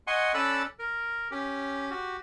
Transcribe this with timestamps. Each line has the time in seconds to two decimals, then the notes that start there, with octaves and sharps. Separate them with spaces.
0.07 D#5 F#5 G#5 C6 C#6
0.34 C#4 A4 D5 B5 E6 F#6
0.79 A#4
1.31 C#4 G4
1.91 F#4 G4